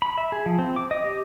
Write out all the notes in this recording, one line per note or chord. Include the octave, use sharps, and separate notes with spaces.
B5
E5
G#4
F3
C4
D6
D#5
G4